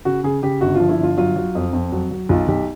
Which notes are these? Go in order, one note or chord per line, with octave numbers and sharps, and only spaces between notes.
C#3 F#4
C#3 G#4
C#3 G4
G1 F#4
F3 F4
E4
G1 F4
F#3 F4
F#3
F2
F2
F#3
F#3
B1 F4
B1 G4